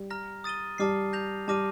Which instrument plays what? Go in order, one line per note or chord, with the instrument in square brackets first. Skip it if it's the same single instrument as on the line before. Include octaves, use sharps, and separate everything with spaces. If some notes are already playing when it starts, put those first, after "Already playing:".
Already playing: [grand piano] G3
[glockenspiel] A#5 F6 A#6
D#6 A6 D#7 G7
[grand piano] G3 [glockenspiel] A5 D6 F6 C7
[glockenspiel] G6 A#6 F7
[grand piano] G3 [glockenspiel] A5 D6 F6 A#6 D#7